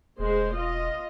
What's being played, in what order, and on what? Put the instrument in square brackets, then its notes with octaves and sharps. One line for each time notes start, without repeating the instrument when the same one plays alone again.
[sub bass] E1 [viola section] G#3 C5
[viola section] F4 D#5